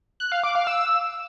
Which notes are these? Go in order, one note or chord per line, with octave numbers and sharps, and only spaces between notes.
F#6
F5
D6
F5
E6